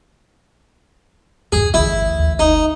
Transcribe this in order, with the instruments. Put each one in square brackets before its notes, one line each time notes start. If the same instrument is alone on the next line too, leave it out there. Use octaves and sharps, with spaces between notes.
[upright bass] B1 G2 [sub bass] E2 [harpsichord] G#4
[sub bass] G#1 [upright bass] D2 E3 [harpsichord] E4
[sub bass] D#2
[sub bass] F#1 [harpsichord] D#4